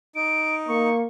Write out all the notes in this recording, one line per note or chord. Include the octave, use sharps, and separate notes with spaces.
D#4 D7
A#3 C#6